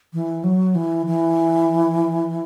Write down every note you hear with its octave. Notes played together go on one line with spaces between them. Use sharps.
E3
F#3
E3
E3